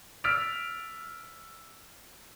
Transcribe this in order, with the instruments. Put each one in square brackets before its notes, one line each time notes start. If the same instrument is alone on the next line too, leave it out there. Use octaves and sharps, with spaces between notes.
[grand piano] E6 F6 A6 B6 D7 F7